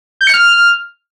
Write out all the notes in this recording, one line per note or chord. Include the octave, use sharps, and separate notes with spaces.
G6
C#7
F6